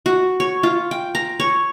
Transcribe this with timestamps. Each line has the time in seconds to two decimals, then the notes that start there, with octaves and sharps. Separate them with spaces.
0.06 F#4
0.40 C#5
0.63 F4
0.91 G5
1.15 A#5
1.40 C#5